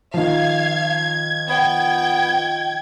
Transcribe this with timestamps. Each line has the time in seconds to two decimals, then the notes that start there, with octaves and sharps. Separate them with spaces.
0.14 D#3 F3 F5 G#6
1.49 B3 G5